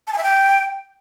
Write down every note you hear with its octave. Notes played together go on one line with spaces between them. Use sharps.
A5
G#5
E5
G5